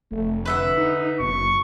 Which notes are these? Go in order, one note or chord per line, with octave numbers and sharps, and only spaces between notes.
F1 A3
D3 B4 E5 F#5
D#4
F#1 B2 C#6